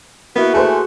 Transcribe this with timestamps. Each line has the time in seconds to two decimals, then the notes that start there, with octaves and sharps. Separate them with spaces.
0.36 A#3 B3 E4 F#4
0.54 A3 G#4 C5